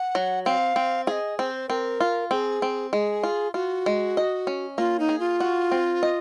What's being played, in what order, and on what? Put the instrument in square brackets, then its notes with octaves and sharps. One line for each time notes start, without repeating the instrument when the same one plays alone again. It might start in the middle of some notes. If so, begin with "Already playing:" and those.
Already playing: [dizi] F#5
[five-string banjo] F#3
[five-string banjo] C4 [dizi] F5
[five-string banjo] C4
[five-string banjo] G#4 [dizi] D#5 F5
[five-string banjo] C4 [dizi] C5
[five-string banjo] C4 [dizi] A#4
[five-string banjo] F4
[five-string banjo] C4 [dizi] G#4
[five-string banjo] C4
[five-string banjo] G#3 [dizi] G#4
[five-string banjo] F4
[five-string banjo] F4 [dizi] F#4
[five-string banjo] G#3
D#5
C#4
[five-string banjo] A#3 [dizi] F4
[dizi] D#4
[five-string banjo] G#4
[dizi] F4
[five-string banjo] F#4
C4
D#5